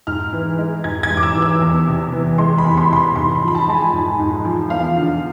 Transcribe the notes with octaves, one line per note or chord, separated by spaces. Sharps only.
G#2 F6
E3
G#3
G#2 G#6
G#6
G#2
D6
E6
E3
E6
E2
C3
E3
G#3 C6
B5
E2
C6
C3 C6
B5
G#2 C6
B5
F3
B5
A5
G#3 A5
G#5
G#2
G#2
F3
E2 F5
D3